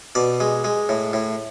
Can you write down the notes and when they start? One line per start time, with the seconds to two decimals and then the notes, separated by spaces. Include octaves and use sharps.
0.15 B2 D5
0.40 G#3
0.64 G#3
0.89 A2
1.13 A2